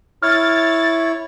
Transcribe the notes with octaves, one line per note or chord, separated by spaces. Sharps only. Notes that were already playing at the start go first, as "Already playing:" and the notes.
E4 C#5 F6 A6